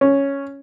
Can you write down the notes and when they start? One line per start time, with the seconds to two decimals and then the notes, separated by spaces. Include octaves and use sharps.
0.01 C#4